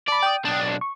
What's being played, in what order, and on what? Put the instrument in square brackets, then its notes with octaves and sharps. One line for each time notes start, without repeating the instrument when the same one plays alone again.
[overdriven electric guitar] D5 [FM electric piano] A5 B5
[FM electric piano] G5 D#6
[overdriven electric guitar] B1 D4
[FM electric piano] C#6